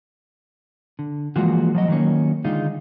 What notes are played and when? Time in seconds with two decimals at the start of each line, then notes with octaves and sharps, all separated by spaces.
0.99 D3
1.36 E3 F3 G#3 A#3 F4 F#4
1.75 F3 F#3 D#5
1.88 D#3 F#3 G3 A#3 C#4
2.44 D3 D#3 G#3 D#4 F4